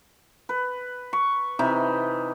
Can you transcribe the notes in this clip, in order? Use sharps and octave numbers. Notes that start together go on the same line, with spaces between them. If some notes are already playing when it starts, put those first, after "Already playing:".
B4
C#6
C3 E3 D#4